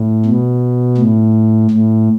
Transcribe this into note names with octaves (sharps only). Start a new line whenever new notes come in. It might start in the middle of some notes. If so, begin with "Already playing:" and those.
Already playing: A2
B2
A2
A2